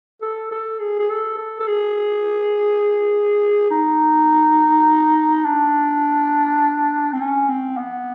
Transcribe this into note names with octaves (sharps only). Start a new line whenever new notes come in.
A4
A4
G#4
G#4
A4
A4
A4
G#4
D#4
D4
C4
C#4
C4
B3